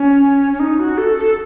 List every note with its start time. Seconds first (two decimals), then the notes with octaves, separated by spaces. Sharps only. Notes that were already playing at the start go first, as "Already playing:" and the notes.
Already playing: C#4
0.53 C#4
0.60 D#4
0.79 F#4
0.98 A4
1.18 A4